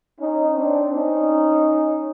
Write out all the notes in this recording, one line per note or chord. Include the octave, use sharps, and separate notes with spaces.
C#4 D#4
C4 D4
C#4 D#4